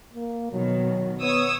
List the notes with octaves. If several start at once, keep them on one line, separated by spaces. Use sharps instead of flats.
A#3
B2 D#3 F#3
B3 C#5 D#6 E6